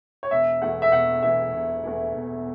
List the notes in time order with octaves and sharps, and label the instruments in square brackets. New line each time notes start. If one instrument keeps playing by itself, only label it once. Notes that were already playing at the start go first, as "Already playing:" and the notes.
[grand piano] C#5
[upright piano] E1 [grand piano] E5
[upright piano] E2 E3 A3 E4 [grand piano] F#5
[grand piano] E5
[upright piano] E1 [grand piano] F#5
[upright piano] E2 E3 A3 E4 [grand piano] E5
[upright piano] E1
E2 E3 A3 E4
E1